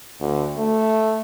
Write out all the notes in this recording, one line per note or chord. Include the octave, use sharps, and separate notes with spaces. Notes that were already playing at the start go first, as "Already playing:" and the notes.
D2
A3